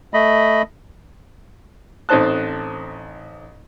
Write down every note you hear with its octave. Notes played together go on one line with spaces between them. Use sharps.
A3 D#5 B5
A1 C4 D#4 C5 A5 F#6